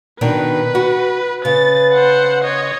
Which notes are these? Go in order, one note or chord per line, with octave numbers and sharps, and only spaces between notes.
B2 D#3 D4 B4
F#4
C#3 B4 A6
C5 F#5
C#5 D#5